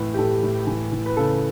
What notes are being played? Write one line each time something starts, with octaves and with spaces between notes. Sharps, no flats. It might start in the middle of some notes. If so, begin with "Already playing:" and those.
Already playing: A2 E3 B4
G4
A2 A4
A2
E3
E3
B4
C#3 A4